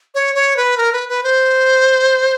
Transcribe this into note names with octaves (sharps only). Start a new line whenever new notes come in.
C#5
C#5
B4
A#4
B4
B4
C5